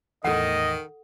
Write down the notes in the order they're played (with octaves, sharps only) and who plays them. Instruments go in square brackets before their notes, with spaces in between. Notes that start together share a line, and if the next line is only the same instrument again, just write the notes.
[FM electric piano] E2 A2 [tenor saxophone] D#3 [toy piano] A4 F#5 [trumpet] D#5